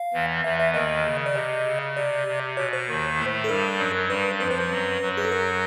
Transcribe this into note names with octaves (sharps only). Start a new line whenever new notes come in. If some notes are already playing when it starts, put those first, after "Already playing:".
Already playing: F5
E2 E3
E2 E3 E5
E5
D#2 D#3 D#5
C#3
D5
C3 D#5
C#3
C3 D5
C3
B2 C#5
C5
D#2 D#3
A2 A3
A4
G2 G3 A#4
F#2 F#3
G2 G3 B4
F2 F3 B4
C5
B4
F#2 F#3
F#2 F#3
G#4
A4
A#4